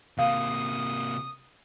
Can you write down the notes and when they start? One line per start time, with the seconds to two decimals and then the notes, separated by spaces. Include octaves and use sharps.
0.19 C3 A#3 F5 D#6